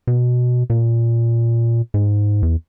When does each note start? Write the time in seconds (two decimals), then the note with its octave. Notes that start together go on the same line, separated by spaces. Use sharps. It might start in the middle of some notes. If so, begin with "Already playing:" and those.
0.07 B2
0.70 A#2
1.94 G#2
2.43 E2